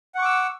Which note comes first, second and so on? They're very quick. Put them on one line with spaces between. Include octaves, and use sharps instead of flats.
F#5 C#6 D6 E6